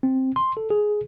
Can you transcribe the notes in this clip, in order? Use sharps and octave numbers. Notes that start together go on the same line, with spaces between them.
C4
C6
A4
G#4